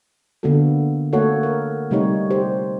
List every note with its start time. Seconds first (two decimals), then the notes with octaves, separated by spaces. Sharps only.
0.43 D3 A#3 B3 F#4 A4
1.13 A3 A#3 F#4 A4 C#5 F#5
1.43 A#4
1.91 C3 G3 A3 D#4 G4 C#5
2.30 G4 C5